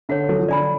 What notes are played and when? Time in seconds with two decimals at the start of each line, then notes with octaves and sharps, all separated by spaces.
0.09 D3 C#5 F#5
0.29 F#3 A4
0.39 F3
0.48 D3 D5 G#5 B5